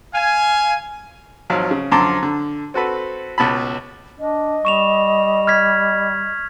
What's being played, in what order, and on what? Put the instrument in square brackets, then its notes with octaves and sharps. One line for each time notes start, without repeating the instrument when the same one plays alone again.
[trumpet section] F5 G#5
[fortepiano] G#1 F3 F#3 F5
C#3
F#2 D3 F3 A5 C6 D6
D3
C4 F#4 A4 B4
C#2 B2 A5 B5
[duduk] D4 [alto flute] D#5
[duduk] G3 [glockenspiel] C#6 E7 F7
[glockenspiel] F6 G#6 B6